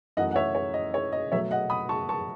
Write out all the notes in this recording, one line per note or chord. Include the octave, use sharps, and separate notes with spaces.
F#2 E3 A3 D#5 F#5
F#5
C#5 E5
C#5
D#5
C#5
D#5
B2 F#3 A3 C#5 E5
D#5 F#5
B5 D#6
A5 C#6
A5 C#6